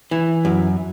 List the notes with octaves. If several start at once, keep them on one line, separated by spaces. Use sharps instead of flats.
E3
F#2